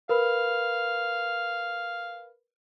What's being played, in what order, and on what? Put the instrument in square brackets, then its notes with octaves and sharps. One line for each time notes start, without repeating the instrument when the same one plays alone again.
[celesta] A#4 B4 B5 [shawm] F5